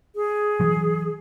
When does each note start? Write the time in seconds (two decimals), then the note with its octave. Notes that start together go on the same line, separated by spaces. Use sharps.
0.15 G#4
0.60 E3 F#3